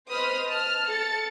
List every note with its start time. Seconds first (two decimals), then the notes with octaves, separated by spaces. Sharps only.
0.11 B4 C5 D#5 B5 D#6 F6
0.48 A5 F6
0.87 A4 A6 C#7